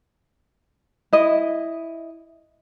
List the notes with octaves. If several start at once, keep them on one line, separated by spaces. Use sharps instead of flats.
E4 D#5